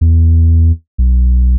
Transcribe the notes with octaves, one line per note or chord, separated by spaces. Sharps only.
E2
B1